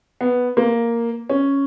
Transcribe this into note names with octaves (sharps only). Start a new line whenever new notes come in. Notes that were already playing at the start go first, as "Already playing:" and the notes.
B3
A#3
C#4